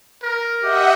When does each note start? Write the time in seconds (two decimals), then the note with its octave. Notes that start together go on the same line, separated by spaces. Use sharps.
0.23 A#4
0.63 G4 D#5 E5 F#5